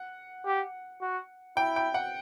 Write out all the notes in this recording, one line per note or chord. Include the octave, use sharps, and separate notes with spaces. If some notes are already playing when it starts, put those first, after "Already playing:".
Already playing: F#5
G4
F#4
E4 G5
G5
F#5